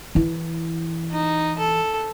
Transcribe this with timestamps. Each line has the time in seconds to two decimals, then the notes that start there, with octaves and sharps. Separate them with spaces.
0.15 E3 E4
1.11 D#4
1.59 A4